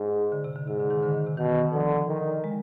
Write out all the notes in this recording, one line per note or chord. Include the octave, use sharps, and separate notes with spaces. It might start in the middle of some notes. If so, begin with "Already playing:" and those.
Already playing: G#2
D3
C3
D3
G#2 C3
D3
D#3
D3
D3
C3
B2 D#3
D3 F3
D#3
G#3